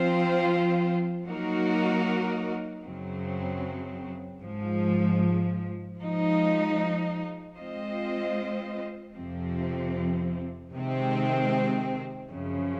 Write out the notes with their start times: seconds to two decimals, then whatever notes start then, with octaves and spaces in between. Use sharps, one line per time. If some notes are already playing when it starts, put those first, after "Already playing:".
Already playing: F3 C4 F4 C5
1.25 F#3 A#3 D#4 F#4 A#4
2.83 F#2 C#3 F#3 C4
4.42 G#2 F3 G#3
5.99 F3 G#3 D#4
7.57 G#3 C4 F4 C5 D#5
9.15 F2 C3 F3 C4
10.73 C3 D#3 G#3 C4
12.30 F#2 C#3 F3